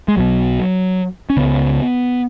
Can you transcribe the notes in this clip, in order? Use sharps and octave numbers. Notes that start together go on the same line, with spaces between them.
G#3
B1 B2 F#3
C#4
C#2 C#3 B3